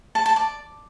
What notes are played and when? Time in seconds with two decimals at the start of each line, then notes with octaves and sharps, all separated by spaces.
0.15 A5
0.26 A5
0.36 D5